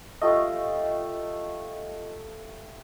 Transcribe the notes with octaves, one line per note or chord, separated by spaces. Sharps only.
A3 F4 G4 D#5 F5